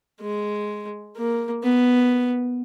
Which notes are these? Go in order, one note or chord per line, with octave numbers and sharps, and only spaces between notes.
G#3
A#3
B3